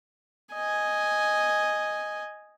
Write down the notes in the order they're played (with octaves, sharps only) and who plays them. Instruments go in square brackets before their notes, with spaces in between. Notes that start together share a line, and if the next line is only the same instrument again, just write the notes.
[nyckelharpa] D#5 G#5